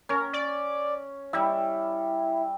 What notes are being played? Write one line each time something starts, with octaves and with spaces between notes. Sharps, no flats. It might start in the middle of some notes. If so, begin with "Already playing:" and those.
C#4 A#4
D5
G3 E4 E5